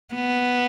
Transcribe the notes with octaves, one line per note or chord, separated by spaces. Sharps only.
B3